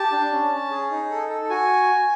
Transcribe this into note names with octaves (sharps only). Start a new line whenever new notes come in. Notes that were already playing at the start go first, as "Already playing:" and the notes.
Already playing: G4 A5
D4
C#4
C#4
G#4
D#4
A4
A4
F#4 G#5